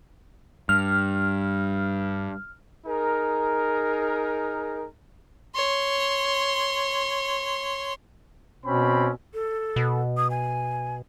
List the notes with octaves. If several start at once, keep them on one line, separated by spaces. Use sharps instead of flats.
G2 F6
D#4 G#4 A#4
C#5 C6
B2 C4 C#4 B5
A4
B2
D#6
G#5